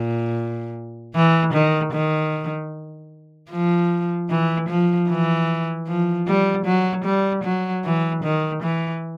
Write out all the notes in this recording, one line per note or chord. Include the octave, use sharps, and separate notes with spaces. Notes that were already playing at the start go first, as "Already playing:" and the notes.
Already playing: A#2
E3
D#3
D#3
F3
E3
F3
E3
F3
G3
F#3
G3
F#3
E3
D#3
E3